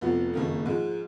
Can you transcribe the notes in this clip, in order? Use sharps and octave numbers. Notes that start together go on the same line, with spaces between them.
F1 F2 F3 B3 F#4
F#1 F2 D#3 A#3
G#2 F3 G#3